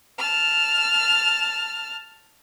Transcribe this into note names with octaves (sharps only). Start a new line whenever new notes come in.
A5 F6